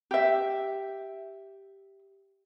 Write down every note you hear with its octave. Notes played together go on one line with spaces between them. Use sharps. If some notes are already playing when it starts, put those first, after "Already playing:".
G4 E5